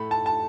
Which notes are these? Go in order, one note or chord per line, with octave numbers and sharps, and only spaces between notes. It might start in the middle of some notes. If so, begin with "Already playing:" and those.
Already playing: A2 A3 B5
A5
A5